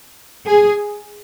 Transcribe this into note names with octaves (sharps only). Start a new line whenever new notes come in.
G#4